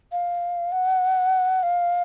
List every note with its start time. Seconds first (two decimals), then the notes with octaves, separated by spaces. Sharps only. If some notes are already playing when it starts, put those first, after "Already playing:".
0.12 F5
0.72 F#5
1.63 F5